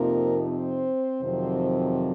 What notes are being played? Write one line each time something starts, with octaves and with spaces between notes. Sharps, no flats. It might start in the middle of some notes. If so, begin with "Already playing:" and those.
Already playing: F2 C3 F3 A#3 C4 D#4 A#4
C4 C5
F2 C3 D#3 F#3 C4